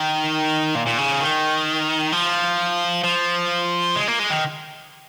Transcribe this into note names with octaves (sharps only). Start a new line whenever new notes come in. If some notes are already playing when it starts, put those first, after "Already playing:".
Already playing: D#3
A#2
A#2
C#3
D#3
F3
F3
G#3
A#3
G#3
D#3